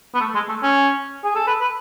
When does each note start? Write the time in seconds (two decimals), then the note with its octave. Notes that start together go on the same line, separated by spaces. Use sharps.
0.15 B3
0.21 A3
0.35 G#3
0.49 A3
0.63 C#4
1.24 G#4
1.35 A4
1.47 B4
1.61 B4